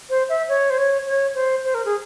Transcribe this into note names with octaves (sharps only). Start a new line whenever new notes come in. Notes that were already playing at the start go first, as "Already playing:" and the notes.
C5
E5
C#5
C5
C#5
C#5
C5
C5
A#4
G#4